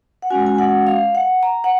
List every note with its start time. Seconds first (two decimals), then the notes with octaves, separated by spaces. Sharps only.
0.22 F#5
0.30 G#3 C#4 F#4 G#5
0.47 G#5
0.58 F#5
0.87 F5
1.15 F#5
1.43 A#5
1.64 F#5